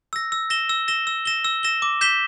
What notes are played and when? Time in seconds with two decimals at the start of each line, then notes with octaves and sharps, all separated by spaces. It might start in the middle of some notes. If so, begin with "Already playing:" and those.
0.13 E6 A#6
0.32 E6
0.50 A#6 E7 G7
0.69 E6
0.88 A#6 E7 G7
1.07 E6
1.25 A#6 E7 G7
1.45 E6
1.63 A#6 E7 G7
1.82 D6
2.01 G6 B6 E7 G7